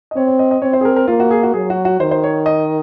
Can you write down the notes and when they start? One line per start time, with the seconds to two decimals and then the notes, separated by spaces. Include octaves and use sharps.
0.11 D#5
0.16 C4 C#5
0.28 C#5
0.39 D#5
0.51 D#5
0.62 C4 C#5
0.73 C5
0.81 G#4
0.85 A#4
0.96 A#4
1.08 A#3 F4
1.20 F#4
1.31 G#4
1.43 F#4
1.53 F#3 G#4
1.70 F#4
1.85 F#4
2.00 D#3 C5
2.11 C5
2.24 C#5
2.46 D#5